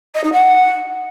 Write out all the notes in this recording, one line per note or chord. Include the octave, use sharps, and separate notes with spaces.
D#5
D#4
F#5